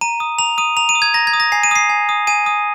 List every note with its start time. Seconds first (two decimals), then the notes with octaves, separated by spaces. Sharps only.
0.01 A#5 D#7
0.20 D#6
0.38 A#5 F7
0.58 D#6 D#7
0.77 A#5 F7
0.89 D#7
0.95 D#6
1.02 G#6
1.14 A#5 A#6
1.27 G#6
1.33 D#6
1.40 A#6
1.52 G#5 C7
1.63 D#7
1.71 D#6 C7
1.89 G#5
2.09 D#6
2.27 G#5 D#7
2.46 D#6